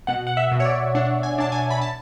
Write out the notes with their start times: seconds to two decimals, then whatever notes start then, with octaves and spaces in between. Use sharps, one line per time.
0.07 B2 F#5
0.27 F#5
0.37 E5
0.52 B2
0.60 C#5
0.65 D5
0.95 D4 F#5
1.23 G#5
1.38 D4 A5
1.52 G#5
1.70 B5
1.81 A5